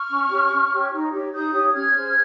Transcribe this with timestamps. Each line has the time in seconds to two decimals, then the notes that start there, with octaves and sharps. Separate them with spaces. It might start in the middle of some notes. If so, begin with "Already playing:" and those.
Already playing: C#6 F6
0.10 C#4
0.30 G4 C#5
0.51 C#4
0.72 G4 C#5
0.92 D#4
1.12 G4 C#5
1.33 D#4 D#6 G6
1.53 G4 C#5
1.74 C#4 F6 G#6
1.95 G#4 C5